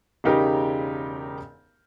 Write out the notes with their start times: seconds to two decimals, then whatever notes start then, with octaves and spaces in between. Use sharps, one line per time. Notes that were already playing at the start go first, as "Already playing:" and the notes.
0.24 E1 C#3 D#4 G4 A#4